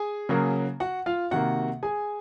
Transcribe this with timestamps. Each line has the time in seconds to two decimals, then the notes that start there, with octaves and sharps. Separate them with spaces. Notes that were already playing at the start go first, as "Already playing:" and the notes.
Already playing: G#4 G#5
0.29 C#3 F#3 A#3
0.80 F#4 F#5
1.06 F4 F5
1.31 C3 D#3 A#3 F#4 F#5
1.83 G#4 G#5